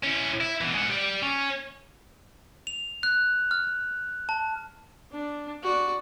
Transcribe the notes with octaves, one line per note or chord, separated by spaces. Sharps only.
C#4 E4
E4
B2 E3
G#3 F#5
G4 D5
C#4
F7
F#6
F6
A5
D4
F#4 D5